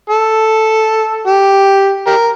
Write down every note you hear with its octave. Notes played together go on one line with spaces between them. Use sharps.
A4
G4
G4 A#4